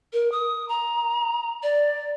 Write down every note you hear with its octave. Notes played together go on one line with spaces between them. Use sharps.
A#4
D#6
A#5
D5